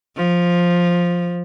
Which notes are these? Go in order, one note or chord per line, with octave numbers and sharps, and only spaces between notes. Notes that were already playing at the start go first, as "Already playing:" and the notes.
F3